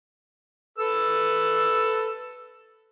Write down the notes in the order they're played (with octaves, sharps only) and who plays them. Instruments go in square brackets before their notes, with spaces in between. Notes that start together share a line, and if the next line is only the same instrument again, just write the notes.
[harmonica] A4 B4 E6